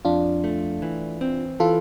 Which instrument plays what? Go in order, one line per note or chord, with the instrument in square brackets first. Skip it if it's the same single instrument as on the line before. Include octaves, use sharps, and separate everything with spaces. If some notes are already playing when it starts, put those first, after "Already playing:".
[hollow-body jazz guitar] F2 [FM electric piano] D4 F4
[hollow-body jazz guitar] A3
E3
C4
[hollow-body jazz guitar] E3 [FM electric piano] F4 A4